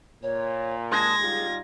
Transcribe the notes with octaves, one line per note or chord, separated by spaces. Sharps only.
A#2 C#5
G#3 A5 G#6 A#6
G3 D#4 F4 G#4